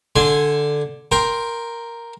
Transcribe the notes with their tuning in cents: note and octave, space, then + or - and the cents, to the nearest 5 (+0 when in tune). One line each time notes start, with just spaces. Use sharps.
D3 +0 G#5 +0 C6 +0
A#4 +0 G5 +0 C6 +0